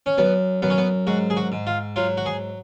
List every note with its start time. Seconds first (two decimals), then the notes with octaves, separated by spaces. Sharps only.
0.06 C#4
0.18 F#2 B3
0.62 F#2 B3
0.70 C#4
0.78 B3
1.07 G#2 F#4
1.30 G#4
1.37 F#4
1.52 G#2
1.67 F4
1.96 F#3 F4
2.17 F#4
2.26 G#4